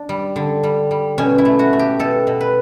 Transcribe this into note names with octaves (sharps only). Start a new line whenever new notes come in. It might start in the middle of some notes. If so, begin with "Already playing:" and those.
Already playing: D4
G3
D3
G3
G3
B2 C#4
E4
A3
F#4
A3
G4
B2 A4
B2
B4